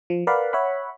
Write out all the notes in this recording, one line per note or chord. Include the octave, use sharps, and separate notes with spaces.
F3
A#4 B4 D5 F5 F#5 B5
C#5 E5 F#5 B5